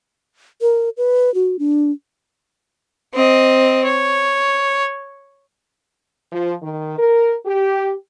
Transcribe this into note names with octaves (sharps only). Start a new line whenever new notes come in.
A#4
B4
F#4
D4
C4 D#5
C#5
F3
D#3
A#4
G4